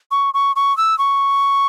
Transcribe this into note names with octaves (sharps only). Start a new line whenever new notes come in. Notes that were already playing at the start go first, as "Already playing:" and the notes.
C#6
C#6
C#6
E6
C#6